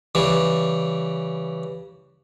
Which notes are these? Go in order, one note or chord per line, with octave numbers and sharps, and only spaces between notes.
C#3 E3 G3